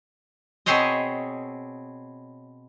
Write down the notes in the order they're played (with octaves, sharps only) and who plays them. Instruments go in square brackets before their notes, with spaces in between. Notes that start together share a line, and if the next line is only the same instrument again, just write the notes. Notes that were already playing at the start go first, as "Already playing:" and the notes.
[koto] B2 C4 G#4 C5 C#5 D#5